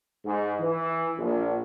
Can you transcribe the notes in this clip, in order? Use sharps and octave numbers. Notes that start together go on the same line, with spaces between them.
G#2
E3
A#1